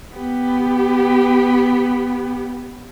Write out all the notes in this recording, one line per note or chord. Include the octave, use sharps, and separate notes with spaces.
B3 G4